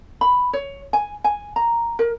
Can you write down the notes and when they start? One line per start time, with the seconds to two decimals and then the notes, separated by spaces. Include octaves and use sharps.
0.21 B5
0.53 C#5
0.93 G#5
1.24 G#5
1.56 A#5
1.99 A#4